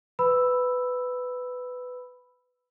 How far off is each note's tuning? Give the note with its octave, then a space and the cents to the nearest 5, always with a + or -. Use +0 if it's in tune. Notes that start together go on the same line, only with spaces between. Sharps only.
B4 +15 B5 +0 E6 +0